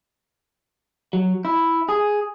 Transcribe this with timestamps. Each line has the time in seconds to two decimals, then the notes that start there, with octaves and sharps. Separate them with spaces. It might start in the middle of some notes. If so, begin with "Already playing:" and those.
1.13 F#3
1.45 E4
1.89 G#4